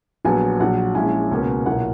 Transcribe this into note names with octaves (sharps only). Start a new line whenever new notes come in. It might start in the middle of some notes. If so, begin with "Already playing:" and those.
A#1 A#2 F#3 B3 G#5
A#1 A#2 F#3 F#5
A#1 A#2 G#3 C#4 E4 G#5
C#2 B2 A#3 C#4
B1 A#2 A#3 E4 F#5